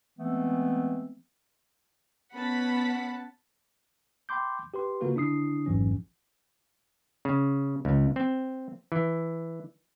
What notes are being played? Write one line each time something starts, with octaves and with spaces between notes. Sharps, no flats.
E3 G#3 A3 B3 C4
B3 C#4 F#5 A5 B5 B6
G5 B5 C6 D6 G6
G4 B4 C6
C#3 A#3 F4 F#4 A4 B4
D3 D4 E4 D#6 C7
A1 F2 G#2 E3 F#3 C#4
C#3
C#2
C4
E3